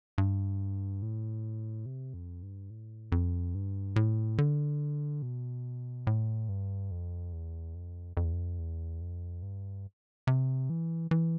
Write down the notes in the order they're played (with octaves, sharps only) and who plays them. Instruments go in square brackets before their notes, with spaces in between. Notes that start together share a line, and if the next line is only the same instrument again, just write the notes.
[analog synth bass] G2
A2
C3
F2
G2
A2
F2
G2
A2
D3
B2
A2
G2
F2
E2
F2
F2
E2
F2
E2
F2
G2
C3
E3
E3